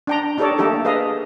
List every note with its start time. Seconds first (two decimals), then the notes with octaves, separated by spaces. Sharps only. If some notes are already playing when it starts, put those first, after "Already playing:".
0.07 D4 G5 A#5
0.38 D4 D#4 G4 A4 C#5 D5
0.58 A3 A#3 D#4 G4 A4
0.85 G#4 B4 D#5 F5